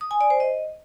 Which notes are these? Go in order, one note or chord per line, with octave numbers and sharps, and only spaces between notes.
D#6
G#5
D5
C5
D#5